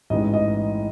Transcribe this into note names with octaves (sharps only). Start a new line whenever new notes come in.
A1 G#2 E3 G#3 D#5
D#5